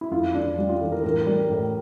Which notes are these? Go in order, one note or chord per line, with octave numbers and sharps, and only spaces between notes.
E4
F2 F4
F2 D4
G3 D4
F4
E3 A4
A#4
A2 A#4
G3
A2